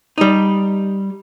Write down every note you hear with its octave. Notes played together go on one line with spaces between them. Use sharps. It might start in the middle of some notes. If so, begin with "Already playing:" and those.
G3 D#4